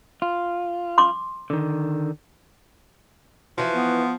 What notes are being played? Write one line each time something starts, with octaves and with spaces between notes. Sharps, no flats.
F4
C6 D6
D3 D#3
E3 F3 F#4
B3